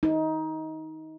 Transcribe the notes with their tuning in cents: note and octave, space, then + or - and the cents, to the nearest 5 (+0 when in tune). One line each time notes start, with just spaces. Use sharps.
D#4 +20